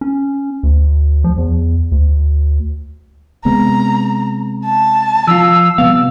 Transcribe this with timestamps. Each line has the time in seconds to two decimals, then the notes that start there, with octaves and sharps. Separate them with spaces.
0.01 C#4
0.63 D2
1.24 F3
1.37 E2
1.92 D2
3.45 C3 G#3 B3 A#5
4.65 A5
5.27 F3 F4 E6
5.78 C3 G3 B3 F5